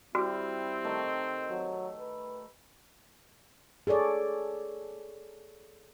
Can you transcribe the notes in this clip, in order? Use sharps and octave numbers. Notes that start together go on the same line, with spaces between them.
G3 C4 E4 F#4
D#3 A3
F#3
B4
G#4 A4 C#5 D5